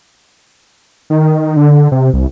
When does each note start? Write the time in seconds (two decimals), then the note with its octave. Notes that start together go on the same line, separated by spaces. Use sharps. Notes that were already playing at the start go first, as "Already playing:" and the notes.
1.10 D#3
1.56 D3
1.92 C3
2.14 C2